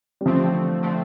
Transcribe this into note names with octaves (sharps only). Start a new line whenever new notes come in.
G3
D3 F3 A3 C4
D3 A3 C4